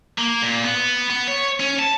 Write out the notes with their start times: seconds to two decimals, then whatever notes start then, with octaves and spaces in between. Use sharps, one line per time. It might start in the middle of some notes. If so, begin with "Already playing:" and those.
0.18 A#3
0.42 A#2
0.63 B3
1.10 B3
1.28 C#5
1.60 C#4
1.79 A5